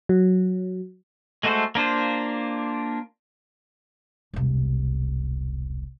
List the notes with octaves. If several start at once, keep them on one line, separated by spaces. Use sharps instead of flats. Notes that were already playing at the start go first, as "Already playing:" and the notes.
F#3
G#3 A3 F#4 A4 C5
A#3 D4 F4 C5
E1 C2